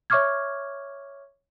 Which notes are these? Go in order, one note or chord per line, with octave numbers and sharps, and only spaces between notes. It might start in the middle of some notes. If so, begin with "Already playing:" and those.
C#5 E5 C#6 D6 F6 G#6